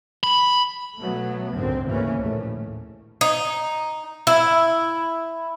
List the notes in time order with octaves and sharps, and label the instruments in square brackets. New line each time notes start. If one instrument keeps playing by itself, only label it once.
[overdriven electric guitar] B5
[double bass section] B2 F#3 A3 B3
G#1 C#2 F#2 D3 C4
D2 C#3 E3 A#3 C#4
A#1 D#2 A2 A3
[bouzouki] D#4
E4